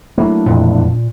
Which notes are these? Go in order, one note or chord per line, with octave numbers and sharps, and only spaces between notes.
F#3 A3 A#3 D4 E4
E1 F2 A#2